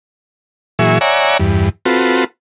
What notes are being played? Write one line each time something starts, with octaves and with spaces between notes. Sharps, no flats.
A#2 E3 F#3 G#4 E5 C#6
C#5 D5 E5 F#5 G#5 A#5
E2 G2
C4 F4 F#4 A4 B4